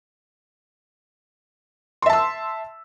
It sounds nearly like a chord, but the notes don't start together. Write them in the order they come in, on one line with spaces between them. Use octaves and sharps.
C6 E5 A5 E6